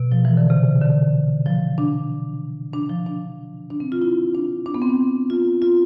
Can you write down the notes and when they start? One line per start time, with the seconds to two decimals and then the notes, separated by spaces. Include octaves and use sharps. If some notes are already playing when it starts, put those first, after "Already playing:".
Already playing: B2
0.12 F3
0.25 E3
0.37 D3
0.50 C3
0.82 D3
1.46 F3
1.78 D4
2.74 D4
2.90 F3
3.06 D4
3.70 D4
3.80 C4
3.92 F4
4.02 E4
4.35 D4
4.66 D4
4.74 B3
4.82 C4
4.90 D4
5.30 F4
5.62 F4